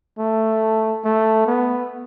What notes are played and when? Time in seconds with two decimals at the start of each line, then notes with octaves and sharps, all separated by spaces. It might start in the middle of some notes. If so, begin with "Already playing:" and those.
0.19 A3
1.05 A3
1.47 B3